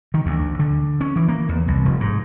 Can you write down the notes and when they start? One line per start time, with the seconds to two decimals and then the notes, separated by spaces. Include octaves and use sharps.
0.14 D#3
0.26 D2
0.59 D3
1.01 C#4
1.16 E3
1.28 A#3
1.49 E2
1.68 C2
1.85 F1
2.00 G#2